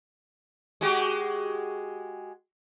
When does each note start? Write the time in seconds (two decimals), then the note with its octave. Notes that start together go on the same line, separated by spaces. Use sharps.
0.81 G#3 F#4 G4